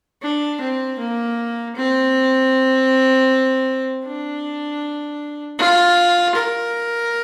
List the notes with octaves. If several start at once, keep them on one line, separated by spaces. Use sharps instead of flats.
D4
C4
A#3
C4
D4
F4
A#4